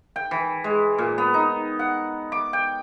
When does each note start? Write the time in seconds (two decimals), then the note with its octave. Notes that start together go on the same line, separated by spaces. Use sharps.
0.16 G5
0.31 E3
0.64 G#3
0.98 A#2
1.18 B3
1.34 D#4
1.79 F#5
2.32 D6
2.53 G5